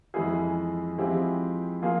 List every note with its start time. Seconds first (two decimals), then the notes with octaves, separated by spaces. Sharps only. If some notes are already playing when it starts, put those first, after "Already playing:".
0.14 F2 E3 G#3 E4 G#4
0.98 F3 G#3 C4 E4 G4
1.82 F3 A#3 F4 G#4